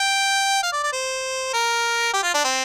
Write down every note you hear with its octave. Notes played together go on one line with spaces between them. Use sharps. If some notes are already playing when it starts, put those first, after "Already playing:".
Already playing: G5
F5
D5
D5
C5
A#4
G4
F4
D4
C4